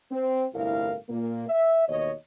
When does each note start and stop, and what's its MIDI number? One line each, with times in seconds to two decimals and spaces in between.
0.11 0.45 60
0.54 0.94 31
0.54 0.94 36
0.54 0.94 45
0.54 0.94 64
0.54 0.94 70
0.54 0.94 77
1.09 1.46 46
1.09 1.46 58
1.49 1.87 76
1.88 2.11 39
1.88 2.11 47
1.88 2.11 73
1.88 2.11 75